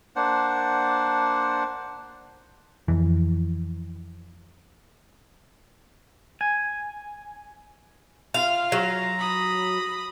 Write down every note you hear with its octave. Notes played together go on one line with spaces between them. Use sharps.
A#3 D4 C5 F#5
F2 E3
G#5
F4 F5
F#3 A#5
B5 D#6